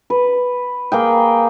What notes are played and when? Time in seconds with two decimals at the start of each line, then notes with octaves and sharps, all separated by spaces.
0.10 B4
0.92 A#3 G#4 G5